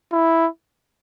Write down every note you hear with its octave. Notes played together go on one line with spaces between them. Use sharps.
E4